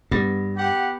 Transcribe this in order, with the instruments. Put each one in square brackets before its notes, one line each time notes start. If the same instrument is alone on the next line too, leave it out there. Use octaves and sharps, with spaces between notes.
[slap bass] G2 [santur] B3
[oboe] G4 [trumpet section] F#5